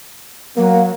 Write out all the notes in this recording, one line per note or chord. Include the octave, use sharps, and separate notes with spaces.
F#3 A#3